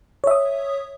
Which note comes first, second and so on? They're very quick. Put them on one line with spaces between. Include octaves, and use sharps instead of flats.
C#5 E5 D#6